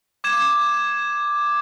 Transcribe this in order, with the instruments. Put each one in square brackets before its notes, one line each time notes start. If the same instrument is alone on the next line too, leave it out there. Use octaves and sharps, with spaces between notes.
[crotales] D6 G#6 E7